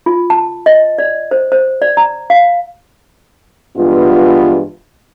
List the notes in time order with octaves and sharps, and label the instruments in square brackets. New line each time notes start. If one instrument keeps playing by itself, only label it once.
[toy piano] F4
A5
D#5
D5
C5
C5
D5
A#5
F5
[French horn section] G2 E3 G#3 B3 F4